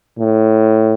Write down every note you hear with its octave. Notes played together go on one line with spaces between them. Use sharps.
A2